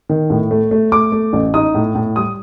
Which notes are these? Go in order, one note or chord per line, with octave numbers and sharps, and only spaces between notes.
D#3
A2
A3
A3
A3 D6
A3
A1
D#4 D#6
A2
A2
G3 D#6